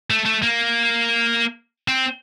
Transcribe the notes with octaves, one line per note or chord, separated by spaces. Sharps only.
A3
A3
A#3
C4